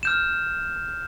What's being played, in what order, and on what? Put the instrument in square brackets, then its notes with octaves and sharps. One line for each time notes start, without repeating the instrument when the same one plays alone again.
[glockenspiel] F6 G6 E7